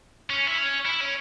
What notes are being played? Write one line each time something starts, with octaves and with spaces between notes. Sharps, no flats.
C#4
E4
C#4
E4
C#4